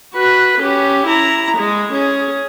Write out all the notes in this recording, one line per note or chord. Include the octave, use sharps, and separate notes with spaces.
F#4 B4
C#4 G4
E4 A#5
G#3 G#4
C#4 G#4